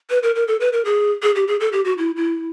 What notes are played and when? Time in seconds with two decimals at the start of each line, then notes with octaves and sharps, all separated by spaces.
0.10 B4
0.23 A#4
0.35 A#4
0.48 A4
0.61 B4
0.73 A#4
0.85 G#4
1.23 G#4
1.35 G4
1.48 G#4
1.60 A4
1.72 G4
1.85 F#4
1.98 E4
2.17 E4